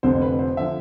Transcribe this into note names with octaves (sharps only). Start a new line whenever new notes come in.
F1 F2 D3 F3 C5
B4
C5
D3 F3 E5